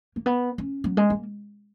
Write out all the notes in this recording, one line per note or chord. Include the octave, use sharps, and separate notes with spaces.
A#3
B3
C#4
F#3
G#3
A#3